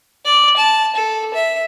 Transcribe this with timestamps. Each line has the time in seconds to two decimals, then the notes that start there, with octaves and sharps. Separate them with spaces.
0.25 D5
0.57 A5
0.95 A4
1.34 E5